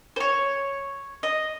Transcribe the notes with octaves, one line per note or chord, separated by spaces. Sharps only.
C5
C#5
D#5